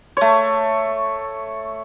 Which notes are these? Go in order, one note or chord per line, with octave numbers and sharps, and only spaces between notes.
A3 C#5